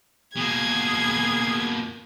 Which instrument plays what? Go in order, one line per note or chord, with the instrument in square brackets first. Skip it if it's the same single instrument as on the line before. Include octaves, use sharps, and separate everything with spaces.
[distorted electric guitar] B2 A#3 [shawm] G#4 [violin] G#6